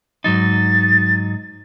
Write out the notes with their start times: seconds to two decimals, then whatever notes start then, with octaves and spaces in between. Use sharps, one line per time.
0.24 G#2 F#3 D#4 A6